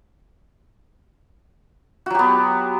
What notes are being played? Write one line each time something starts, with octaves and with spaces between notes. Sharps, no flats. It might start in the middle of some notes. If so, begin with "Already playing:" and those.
F#3 B3 F#4 G4